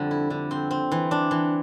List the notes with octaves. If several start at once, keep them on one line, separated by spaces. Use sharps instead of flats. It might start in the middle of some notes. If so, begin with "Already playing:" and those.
Already playing: F2 D3 G3
E4
D3
C4
C4
E3
D4
E3